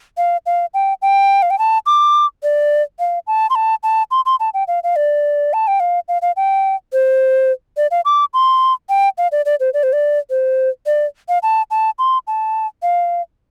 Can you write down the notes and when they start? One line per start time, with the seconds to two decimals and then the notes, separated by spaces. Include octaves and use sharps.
0.17 F5
0.46 F5
0.74 G5
1.02 G5
1.42 F5
1.50 G5
1.59 A5
1.86 D6
2.43 D5
2.99 F5
3.27 A5
3.50 C6
3.55 A5
3.83 A5
4.11 C6
4.26 C6
4.40 A5
4.54 G5
4.68 F5
4.84 F5
4.96 D5
5.53 A5
5.68 G5
5.80 F5
6.08 F5
6.22 F5
6.36 G5
6.93 C5
7.77 D5
7.91 F5
8.05 D6
8.34 C6
8.89 G5
9.18 F5
9.32 D5
9.46 D5
9.60 C5
9.74 D5
9.83 C5
9.93 D5
10.30 C5
10.86 D5
11.29 F5
11.43 A5
11.71 A5
11.99 C6
12.27 A5
12.83 F5